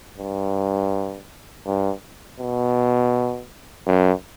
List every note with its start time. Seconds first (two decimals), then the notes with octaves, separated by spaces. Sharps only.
0.18 G2
1.66 G2
2.40 B2
3.87 F#2